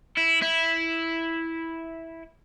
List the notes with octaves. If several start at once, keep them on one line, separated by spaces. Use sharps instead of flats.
E4
E4